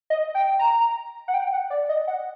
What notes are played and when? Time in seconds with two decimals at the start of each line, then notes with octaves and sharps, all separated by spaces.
0.10 D#5
0.35 G5
0.59 A#5
1.28 F#5
1.34 G5
1.53 F#5
1.70 D5
1.89 D#5
2.08 F#5